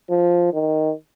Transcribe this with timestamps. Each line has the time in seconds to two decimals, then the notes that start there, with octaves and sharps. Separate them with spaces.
0.10 F3
0.53 D#3